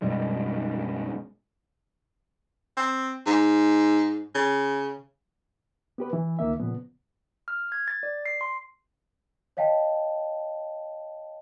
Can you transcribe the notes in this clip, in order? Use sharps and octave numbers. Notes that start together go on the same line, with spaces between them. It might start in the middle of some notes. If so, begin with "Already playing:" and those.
F#2 B2 G3 G#3
C4
G#2
C#3
B3 G4 B4
E3
C#2 D#3 A#3 E5
A#2 C#3 F3 B3
F6
G#6
A6
D5
C7
C6
C#5 D#5 F5 G5 A5